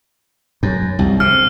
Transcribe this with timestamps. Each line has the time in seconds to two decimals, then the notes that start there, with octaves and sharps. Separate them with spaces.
0.63 F#2
0.99 C2
1.20 C3 F6